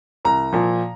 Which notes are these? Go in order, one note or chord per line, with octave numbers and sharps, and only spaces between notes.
C2 A#5
A#2 F3